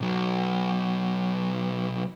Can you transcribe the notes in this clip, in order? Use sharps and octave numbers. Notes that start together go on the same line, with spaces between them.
B1 F#3